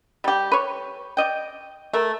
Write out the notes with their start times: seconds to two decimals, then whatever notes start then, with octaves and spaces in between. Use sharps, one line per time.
0.24 G3 G4
0.52 B4 C#5
1.17 D5 D#5 G5
1.93 A3 A#4